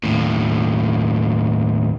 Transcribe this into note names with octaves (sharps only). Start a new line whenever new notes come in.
D#2 A2